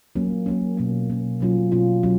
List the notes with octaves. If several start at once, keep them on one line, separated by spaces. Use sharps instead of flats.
F#3 A#3 C#4
F#3 A#3 C#4
B2 A#3 C#4
B2 A#3 C#4
B2 F#3 C#4 F4
B2 F#3 C#4 F4
F#3 C#4